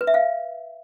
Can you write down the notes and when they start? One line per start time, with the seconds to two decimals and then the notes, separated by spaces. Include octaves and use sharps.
0.01 B4
0.07 E5
0.14 F5